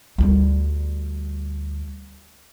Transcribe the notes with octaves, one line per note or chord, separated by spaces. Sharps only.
D2 G3